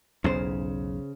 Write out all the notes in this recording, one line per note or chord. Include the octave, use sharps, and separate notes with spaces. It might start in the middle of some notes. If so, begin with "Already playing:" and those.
B1 E2 G#2 C#3 C5